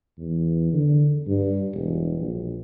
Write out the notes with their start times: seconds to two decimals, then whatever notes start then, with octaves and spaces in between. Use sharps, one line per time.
0.18 E2
0.73 D3
1.27 G2
1.74 E1
2.19 A#1